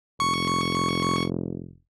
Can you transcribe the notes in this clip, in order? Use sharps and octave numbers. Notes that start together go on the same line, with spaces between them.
F1 C#6